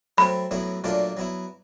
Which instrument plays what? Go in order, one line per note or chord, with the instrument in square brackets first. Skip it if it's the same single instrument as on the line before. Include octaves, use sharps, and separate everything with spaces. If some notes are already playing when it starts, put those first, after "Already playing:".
[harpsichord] F#3 A3 C4 [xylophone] B5
[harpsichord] A2 F#3 B3 E4
A#2 F#3 A3 D4 F4
F#3 B3 E4